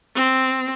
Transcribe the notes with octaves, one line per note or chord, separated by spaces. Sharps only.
C4